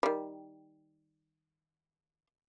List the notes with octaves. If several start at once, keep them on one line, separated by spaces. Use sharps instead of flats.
D#3 G3